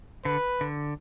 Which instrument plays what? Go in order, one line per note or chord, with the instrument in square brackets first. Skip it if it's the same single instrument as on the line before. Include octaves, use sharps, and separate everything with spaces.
[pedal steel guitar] D3 [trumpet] B4
[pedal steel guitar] D3